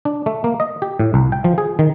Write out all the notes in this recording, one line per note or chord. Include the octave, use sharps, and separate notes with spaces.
D4
A3
A#3
D#5
G4
A2
C2
G5
F3
G#4
D#3